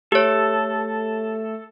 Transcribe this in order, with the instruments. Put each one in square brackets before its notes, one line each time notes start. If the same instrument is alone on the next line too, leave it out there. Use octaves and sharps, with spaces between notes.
[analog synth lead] A3 [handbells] G4 C#5 [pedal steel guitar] A4